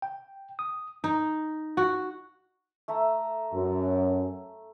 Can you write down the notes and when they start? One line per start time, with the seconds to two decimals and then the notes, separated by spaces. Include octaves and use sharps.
0.02 G5
0.59 D#6
1.04 D#4
1.77 F#4
2.88 A3 E5 A#5
3.53 F#2